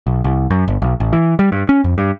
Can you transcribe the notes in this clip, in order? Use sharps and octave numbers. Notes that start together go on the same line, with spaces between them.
B1
C2
F#2
G1
B1
A1
E3
G3
G2
C#4
F2
G2